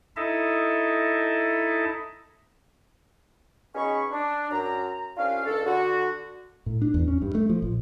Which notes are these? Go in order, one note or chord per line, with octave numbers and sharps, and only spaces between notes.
D#4 E4 A4 D#5 E5 A5
B2 C#4 D#4 G#4 B5 C#6
D4
F#2 A#5
C2 C#4 D4 F4 F5
C#2 D4 A4
D3 F#4
A2
D4
E2
C#4
G2
A3
F3
A#1